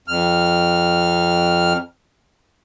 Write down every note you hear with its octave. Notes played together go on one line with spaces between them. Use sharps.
F2 F6